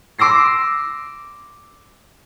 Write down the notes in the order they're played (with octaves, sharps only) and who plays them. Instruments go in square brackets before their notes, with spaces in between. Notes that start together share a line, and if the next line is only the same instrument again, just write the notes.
[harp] C6 D6 E6 A#6 C7